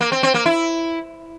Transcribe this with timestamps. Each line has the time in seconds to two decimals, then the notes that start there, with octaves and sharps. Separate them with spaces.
0.01 A#3
0.12 C4
0.23 C4
0.34 A#3
0.46 E4